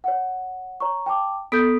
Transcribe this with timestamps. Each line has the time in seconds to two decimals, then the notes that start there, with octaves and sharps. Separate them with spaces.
0.04 C#5 F#5
0.80 C#5 A#5 C#6
1.06 G5 A5 D6
1.52 B3 A4 D#6 G6 B6 D7